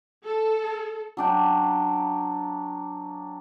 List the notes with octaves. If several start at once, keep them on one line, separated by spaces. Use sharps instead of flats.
A4
F#3 D4 G5